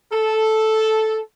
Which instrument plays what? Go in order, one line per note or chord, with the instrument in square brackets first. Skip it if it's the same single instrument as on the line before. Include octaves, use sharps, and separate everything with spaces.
[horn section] A4